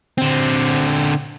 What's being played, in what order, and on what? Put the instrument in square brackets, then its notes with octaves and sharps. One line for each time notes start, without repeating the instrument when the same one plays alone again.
[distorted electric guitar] D3 C4